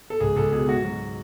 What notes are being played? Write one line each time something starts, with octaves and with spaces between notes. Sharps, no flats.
A4
C#2 G#4
C#2 A4
B2 G#4
G#2 F#4
F#3